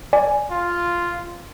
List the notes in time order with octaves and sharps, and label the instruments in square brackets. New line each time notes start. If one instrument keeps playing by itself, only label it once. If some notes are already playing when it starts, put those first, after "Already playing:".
[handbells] D5 G#5
[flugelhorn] F4